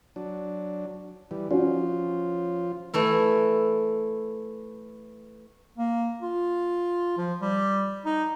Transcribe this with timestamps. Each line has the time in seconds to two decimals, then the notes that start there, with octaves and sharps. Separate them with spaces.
0.16 F#3 D4
1.31 E3 G3
1.51 F3 C#4 F4 F#4
2.94 E3 A3 E4
5.78 A#3
6.22 F4
7.18 F3
7.41 G3
8.05 D#4